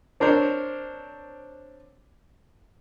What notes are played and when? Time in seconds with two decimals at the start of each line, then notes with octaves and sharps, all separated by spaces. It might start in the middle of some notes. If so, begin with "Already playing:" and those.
0.20 C4 D4 A#4 C5 C#5